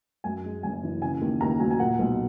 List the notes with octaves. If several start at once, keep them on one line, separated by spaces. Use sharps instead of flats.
F#2 G#5
G#3
F#1 G#5
E3
C#3 G#5
D#2
D#2 A#5
F#3 G#5
G#5
A#2 F#5
B1